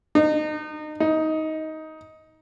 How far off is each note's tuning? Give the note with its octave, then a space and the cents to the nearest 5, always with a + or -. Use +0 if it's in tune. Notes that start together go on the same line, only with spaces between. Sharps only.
D#4 -30
D#4 +15